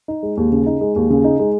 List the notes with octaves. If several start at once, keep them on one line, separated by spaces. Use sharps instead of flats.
D#4
G#3
D#2
C#3
D#4
G#3
D#2
C#3
D#4
G#3